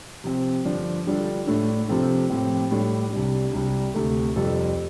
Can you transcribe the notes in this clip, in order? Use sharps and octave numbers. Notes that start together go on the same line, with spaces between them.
C3 F3 C4
G2 D3 F3 D4
D3 G3 D4 F4 A4
A2 A3 D4 A4
C3 F3 C4 F4 A4
A2 F3 C4 G4
A2 G3 D4
C2 C3 G3 D4
C2 C3 G3
D2 C3 A3
F2 C3 G3 F4 A4